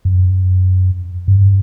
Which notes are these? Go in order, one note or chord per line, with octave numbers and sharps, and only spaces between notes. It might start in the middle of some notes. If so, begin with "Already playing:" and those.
F#2
G2